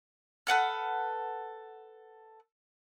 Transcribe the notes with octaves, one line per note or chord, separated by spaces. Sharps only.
A4 B4 F#5 F6